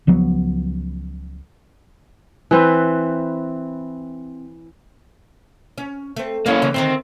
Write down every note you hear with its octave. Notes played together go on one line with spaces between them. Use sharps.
C#2 F3 F#3 B3
E3 C4 B4
C#4
A3 C4
E2 A#3 C#4 E4 F5
C#3 E3
D2 D#3 C4 D#4